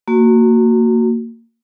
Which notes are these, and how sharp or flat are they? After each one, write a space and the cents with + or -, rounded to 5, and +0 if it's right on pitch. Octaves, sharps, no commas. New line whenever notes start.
A#3 -25 F#4 +0